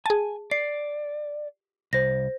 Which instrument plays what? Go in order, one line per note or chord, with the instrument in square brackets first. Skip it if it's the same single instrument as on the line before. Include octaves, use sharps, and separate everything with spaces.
[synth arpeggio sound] G#4 A5 [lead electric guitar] G#5
[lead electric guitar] D5 [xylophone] C7
[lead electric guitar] C2 [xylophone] C5 A#6